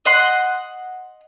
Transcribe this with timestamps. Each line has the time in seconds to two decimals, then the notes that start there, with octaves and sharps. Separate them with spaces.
0.05 D#5 F#5 C6